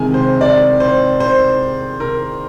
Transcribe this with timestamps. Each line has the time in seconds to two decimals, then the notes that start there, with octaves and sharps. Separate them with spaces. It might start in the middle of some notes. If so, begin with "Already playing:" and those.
Already playing: C3 D#3 G#3 G#5
0.14 C5
0.41 D5
0.80 C5
1.20 C5
2.00 A#4